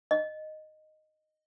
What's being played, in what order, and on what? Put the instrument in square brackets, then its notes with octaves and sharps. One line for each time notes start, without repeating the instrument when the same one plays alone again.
[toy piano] D#5